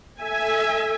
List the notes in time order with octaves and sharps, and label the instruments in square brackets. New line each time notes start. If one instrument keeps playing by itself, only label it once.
[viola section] A4 E5 G#5